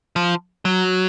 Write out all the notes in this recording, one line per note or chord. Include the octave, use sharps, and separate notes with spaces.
F3
F#3